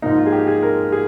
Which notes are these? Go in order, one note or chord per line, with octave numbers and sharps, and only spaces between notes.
G#2 F3 A#3 D#4
F4
G#4
G4
G#4
A#4
G#4